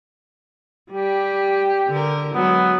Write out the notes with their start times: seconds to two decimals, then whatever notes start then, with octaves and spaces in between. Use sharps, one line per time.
0.92 G3 G4
1.88 D3 A#4
2.35 F#3 G#3 B3